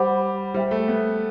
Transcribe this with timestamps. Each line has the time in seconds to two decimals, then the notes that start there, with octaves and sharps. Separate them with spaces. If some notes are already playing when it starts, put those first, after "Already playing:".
Already playing: G3 C5 F#5 B5 D6
0.54 G3 C5 E5 G5
0.71 A3
0.88 B3